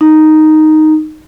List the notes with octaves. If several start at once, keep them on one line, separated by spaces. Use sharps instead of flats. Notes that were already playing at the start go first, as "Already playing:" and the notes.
D#4